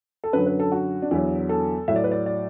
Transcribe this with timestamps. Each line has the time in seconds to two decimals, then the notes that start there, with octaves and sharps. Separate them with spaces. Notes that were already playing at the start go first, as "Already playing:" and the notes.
0.24 A4
0.33 F#2 D3 F#3 B4
0.46 B4
0.60 A4
0.72 F#4
1.02 D4
1.11 E2 D3 F#3 E4
1.49 A4
1.88 A2 F#3 E5
1.96 D5
2.04 B4
2.11 D5
2.26 D5